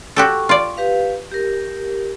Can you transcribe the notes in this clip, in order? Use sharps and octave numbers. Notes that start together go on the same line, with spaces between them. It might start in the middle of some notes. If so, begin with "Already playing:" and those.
F#4 G4 A4 C#6
F4 D5
G4 B4 F5
G4 A#4